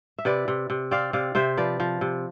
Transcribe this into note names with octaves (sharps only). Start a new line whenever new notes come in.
E5
C3 B4 D5
C3
C3
C4 D5 F5
C3 D5 F5
C3 C5 E5
F3 B4 D5
F3
C3